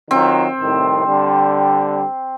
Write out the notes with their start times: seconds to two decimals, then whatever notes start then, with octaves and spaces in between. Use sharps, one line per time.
0.11 D#3 F#3 C4 F4
0.61 C2 A2 D#3
1.06 D3 G3